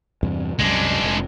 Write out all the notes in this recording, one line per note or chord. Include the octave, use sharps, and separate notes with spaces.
E2 G2 C3
C2 F#2 G#3 D4
F1